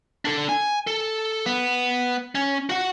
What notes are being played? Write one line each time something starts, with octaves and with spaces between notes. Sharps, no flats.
D4 A4
G#5
A4
B3
C#4
F#4 F#5